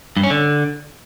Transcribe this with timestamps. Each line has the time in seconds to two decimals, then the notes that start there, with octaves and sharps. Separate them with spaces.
0.17 G2
0.24 C#4
0.30 D3